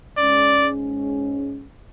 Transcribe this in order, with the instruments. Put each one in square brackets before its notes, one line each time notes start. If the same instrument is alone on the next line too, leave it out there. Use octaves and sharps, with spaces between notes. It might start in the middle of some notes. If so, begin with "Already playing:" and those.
[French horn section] G#2 G#3 C#4 [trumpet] D5